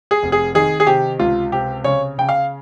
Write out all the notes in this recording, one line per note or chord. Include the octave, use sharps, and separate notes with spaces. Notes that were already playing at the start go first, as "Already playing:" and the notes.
G#4
F1
G#4
D#3 G#4
G#4
C3 G4
C#2 F4
C3 G4
C#3 C#5
C#3 G5
F5